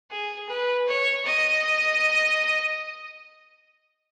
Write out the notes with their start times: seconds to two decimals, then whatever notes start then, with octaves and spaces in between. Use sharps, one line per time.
0.11 G#4
0.49 B4
0.88 C#5
1.25 D#5